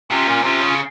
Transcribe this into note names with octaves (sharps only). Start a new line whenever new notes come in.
C3 C#4 F4
A#2
C3 C#4 F4
C#3